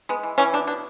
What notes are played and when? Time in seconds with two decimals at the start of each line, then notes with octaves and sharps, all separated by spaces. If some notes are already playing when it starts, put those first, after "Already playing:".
0.09 G#3 B3
0.23 E3
0.38 E3 C#4
0.53 B2 D4
0.67 B2 D4